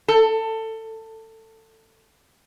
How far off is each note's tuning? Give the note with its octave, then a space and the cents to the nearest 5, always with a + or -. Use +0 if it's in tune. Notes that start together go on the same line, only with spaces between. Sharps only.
A4 +20